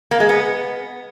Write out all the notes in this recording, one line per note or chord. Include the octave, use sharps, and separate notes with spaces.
A#3
G#3
B3